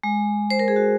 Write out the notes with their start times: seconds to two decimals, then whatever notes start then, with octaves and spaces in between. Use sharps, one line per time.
0.04 G#3
0.50 C5
0.59 A#4
0.68 G#4
0.76 F#4